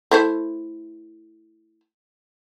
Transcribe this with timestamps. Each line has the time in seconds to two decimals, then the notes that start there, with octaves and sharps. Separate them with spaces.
0.11 A3 E4 C5